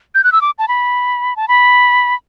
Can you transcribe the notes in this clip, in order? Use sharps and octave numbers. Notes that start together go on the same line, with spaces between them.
G6
F#6
E6
D6
A5
B5
A5
B5